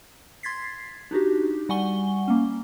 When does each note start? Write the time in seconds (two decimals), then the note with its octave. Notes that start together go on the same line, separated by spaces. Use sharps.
0.43 C6 G#6 A6 B6 C7
1.11 D4 D#4 F#4 G4
1.69 G3 F#5 G#5 C#6 G7
2.28 A#3 C#4